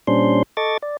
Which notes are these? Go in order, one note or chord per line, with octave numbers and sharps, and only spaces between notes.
A#2 G3 C#4 D4 C5 C6
A4 D#5 C#6 D6 A6
D5